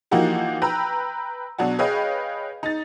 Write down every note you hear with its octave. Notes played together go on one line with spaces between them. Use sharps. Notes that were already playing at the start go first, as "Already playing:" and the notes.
E3 F3 A#3 D#4 F#4 G4
B4 G5 A#5 E6
B2 F#3 D4 F#4
G#4 B4 C#5 D#5 F5 G5
D#4 A6